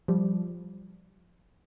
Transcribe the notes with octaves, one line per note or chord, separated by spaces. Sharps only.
F3 G3